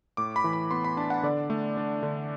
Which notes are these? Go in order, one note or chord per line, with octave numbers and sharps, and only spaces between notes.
A2 D6
B5
E3
B5
B3 C6
B5
D4 A5
F#5
D3 D5
A3
D4
D3